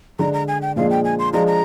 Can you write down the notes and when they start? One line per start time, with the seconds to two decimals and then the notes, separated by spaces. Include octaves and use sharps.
0.19 D3 G#3 D4 A#5
0.34 A#5
0.48 G#5
0.62 G5
0.76 A#2 F3 G#3 D4 F5
0.90 G5
1.04 G#5
1.19 C6
1.33 F3 G#3 D4 F4 A#5
1.47 A#5